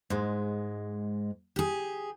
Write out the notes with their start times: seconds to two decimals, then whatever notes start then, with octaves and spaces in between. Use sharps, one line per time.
0.10 G#2 G#3
1.56 G4 G#4